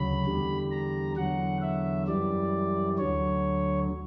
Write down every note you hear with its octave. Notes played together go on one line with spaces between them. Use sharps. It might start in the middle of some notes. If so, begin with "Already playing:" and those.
Already playing: D2 C#3 F#3 B5
E2 D3 G3
A#5
E2 D3 F#3 F#5
E5
F#2 E3 G3 D5
D2 D3 F#3 C#5